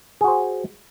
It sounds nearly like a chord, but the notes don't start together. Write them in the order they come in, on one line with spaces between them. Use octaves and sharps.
G#4 F#4 C5